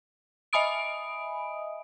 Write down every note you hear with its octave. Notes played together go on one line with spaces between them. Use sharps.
D#5 E5 G#5 B5 D#6 D7